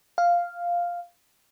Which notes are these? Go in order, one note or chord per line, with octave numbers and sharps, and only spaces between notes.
F5